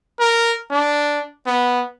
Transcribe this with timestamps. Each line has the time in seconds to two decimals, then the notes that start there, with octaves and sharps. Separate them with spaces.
0.20 A#4
0.70 D4
1.46 B3